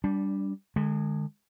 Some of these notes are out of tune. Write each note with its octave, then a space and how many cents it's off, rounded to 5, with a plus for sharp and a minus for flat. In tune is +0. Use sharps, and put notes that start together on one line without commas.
G3 +0 D4 -20
D3 +40 G#3 +0